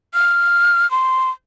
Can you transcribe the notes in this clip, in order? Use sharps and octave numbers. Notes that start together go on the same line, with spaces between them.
F6
C6